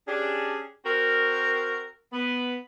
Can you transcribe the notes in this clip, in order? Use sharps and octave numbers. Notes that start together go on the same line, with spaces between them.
C#4 D4 G4 G#4
C4 F#4 A#4
B3